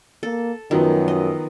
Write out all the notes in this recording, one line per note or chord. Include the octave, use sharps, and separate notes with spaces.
A#3 A4
F#2 D#3 F3 F#3 B3
D#5